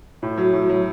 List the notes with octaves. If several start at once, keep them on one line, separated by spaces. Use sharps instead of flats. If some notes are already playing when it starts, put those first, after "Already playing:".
A2
F#3
A2
F#3